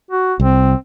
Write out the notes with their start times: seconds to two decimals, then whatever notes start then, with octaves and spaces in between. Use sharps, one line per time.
0.11 F#4
0.40 C2 C4